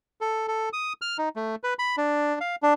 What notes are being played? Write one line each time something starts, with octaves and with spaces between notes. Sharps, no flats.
A4
A4
D#6
F6
D#4
A3
B4
B5
D4
F5
D4